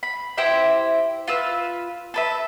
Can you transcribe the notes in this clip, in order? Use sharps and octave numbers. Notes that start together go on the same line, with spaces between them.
B5
E4 G4 C5 E5
F4 B4 E6
A4 B4 E5